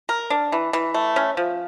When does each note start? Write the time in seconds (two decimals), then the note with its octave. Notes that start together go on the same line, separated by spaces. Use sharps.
0.09 A#4
0.30 D4
0.52 E3
0.73 E3
0.94 A3
1.16 C#4
1.37 F3